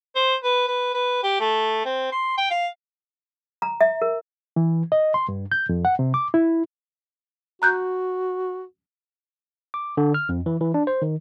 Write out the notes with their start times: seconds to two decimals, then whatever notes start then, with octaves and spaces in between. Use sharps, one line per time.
0.15 C5
0.44 B4
0.68 B4
0.94 B4
1.23 G4
1.40 A3
1.85 C4
2.12 C6
2.38 G5
2.50 F5
3.62 A#5
3.81 E5
4.02 A#4
4.56 E3
4.92 D#5
5.14 C6
5.29 G2
5.52 G6
5.69 F2
5.85 F#5
5.99 C3
6.14 D6
6.34 E4
7.62 F#4 A#5 F#6 G6
9.74 D6
9.97 D3
10.14 F6
10.29 F2
10.46 E3
10.61 E3
10.74 D4
10.87 C5
11.02 D#3